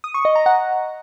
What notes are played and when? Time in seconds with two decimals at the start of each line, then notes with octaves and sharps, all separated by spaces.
0.04 D#6
0.14 C#6
0.25 D#5
0.35 A#5
0.46 F#5